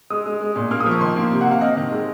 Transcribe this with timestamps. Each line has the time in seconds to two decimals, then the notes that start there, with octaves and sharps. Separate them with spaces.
0.10 G#3 D#6
0.26 G#3
0.41 G#3
0.56 A#2
0.71 A#3 F6
0.80 D#6
0.86 F3 C#6
1.01 D#3 C6
1.16 A#3
1.32 C3
1.41 F#5
1.47 C3 F5
1.61 C4 D#5
1.77 D#3
1.92 G#3